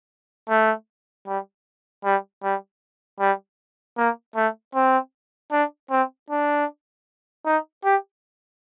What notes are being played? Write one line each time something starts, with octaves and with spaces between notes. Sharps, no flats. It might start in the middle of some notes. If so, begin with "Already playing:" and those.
A3
G3
G3
G3
G3
A#3
A3
C4
D4
C4
D4
D#4
G4